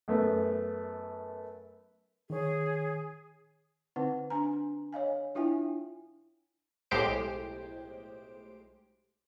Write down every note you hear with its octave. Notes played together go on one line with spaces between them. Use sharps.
F#2 A3 B3
D#3 G#4 C#5
D3 C4 D#4 B4 F#5
D4 G#5 A#5
C#5 D#5 F5 G#5
D4 E4 F4 E5 G5 G#5
B1 A2 G#3 G4 C5 D7